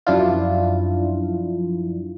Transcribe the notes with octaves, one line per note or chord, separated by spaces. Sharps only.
F#2 F3 D4 E4 F4